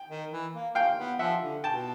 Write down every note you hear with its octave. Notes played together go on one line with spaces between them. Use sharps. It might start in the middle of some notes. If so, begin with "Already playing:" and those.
Already playing: G5
D#3
E3
A#3
A#3 F5 G5
B3
F3 E5 F#5
D3
B2 G5 A5